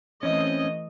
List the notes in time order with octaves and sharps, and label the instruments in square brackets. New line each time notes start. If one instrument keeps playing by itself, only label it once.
[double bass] E3 A3 [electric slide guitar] C4 C#4 [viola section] D#5